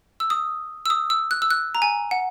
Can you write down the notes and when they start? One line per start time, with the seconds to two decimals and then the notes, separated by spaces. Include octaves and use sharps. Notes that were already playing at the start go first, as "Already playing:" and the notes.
0.20 E6
0.30 D#6
0.86 E6
0.90 D#6
1.10 E6
1.31 F#6
1.42 E6
1.51 F#6
1.75 A#5
1.82 G#5
2.11 F#5